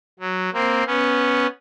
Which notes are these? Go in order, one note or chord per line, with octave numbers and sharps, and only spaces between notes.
F#3
A#3 C4
B3 C#4